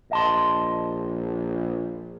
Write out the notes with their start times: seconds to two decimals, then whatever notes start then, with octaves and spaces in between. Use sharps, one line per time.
0.11 A#1 D#5 A5 C6